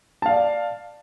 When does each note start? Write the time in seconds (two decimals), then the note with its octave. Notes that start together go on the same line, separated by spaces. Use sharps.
0.22 A5
0.26 F5
0.29 D5